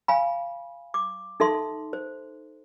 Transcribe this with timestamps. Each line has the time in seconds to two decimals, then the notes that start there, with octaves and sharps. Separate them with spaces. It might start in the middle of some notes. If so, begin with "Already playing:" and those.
0.08 F5 G#5 B5
0.94 D6
1.40 D#4 A4 E5 C6
1.93 C5